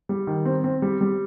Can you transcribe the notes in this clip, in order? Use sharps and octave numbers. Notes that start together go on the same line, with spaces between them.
G3
D#3
C4
C4
G3
G3